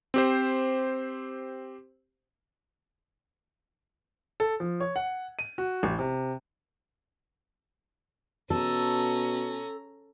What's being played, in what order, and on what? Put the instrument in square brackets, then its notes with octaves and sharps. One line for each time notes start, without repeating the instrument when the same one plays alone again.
[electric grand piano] C4 G4 C5
[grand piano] A4
F3
C#5
F#5
D#7
F#4
A1
C3
[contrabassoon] B2 [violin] C#4 A#5 [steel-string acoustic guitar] A4